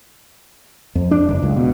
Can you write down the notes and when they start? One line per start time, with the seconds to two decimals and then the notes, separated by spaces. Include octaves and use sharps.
0.95 F2
1.11 D4
1.29 F#1
1.42 C#2
1.56 B2